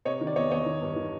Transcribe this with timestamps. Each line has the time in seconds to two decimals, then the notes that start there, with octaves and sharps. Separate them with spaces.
0.05 C3 C#5 D#5
0.21 D#3
0.27 D5
0.36 E2 C#5 D#5
0.51 E2 C#5 D#5
0.66 D#3
0.82 G2
0.96 D#3